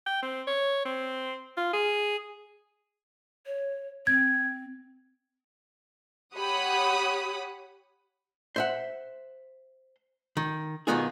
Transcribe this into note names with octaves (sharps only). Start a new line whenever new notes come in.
G5
C4
C#5
C4
F4
G#4
C#5
C4 G#6
G4 C#5 F#5 B5 D#6
C5 E5 F#5
D#3
B1 E2 D#3 B3 F4 G#4